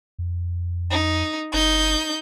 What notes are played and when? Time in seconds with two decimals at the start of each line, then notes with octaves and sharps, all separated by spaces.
0.19 F2
0.91 D#4
1.53 G1 D#4 G6